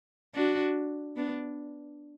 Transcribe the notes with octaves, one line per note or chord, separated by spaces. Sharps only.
D4 F#4
B3 D4